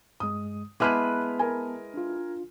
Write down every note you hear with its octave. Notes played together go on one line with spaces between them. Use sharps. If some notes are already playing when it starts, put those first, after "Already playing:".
G2 G#3 D#6
G#3 B3 E4 B4 A5 D6 F6 D#7
A#4 G#5
D4 F4